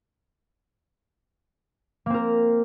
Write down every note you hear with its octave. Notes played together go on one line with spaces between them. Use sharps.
A#3 C4 A#4